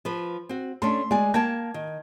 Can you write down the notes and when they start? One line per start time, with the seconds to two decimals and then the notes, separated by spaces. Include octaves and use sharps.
0.05 F3 B4
0.49 C4 F#4
0.82 A3 C#4 D4 C6
1.11 G#3 D5 G#5
1.34 A#3 G5 A5 G#6
1.74 D#3